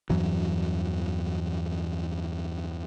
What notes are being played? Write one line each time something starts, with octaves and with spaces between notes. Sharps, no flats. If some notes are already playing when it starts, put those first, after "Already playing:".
E2 G2 E3 F#3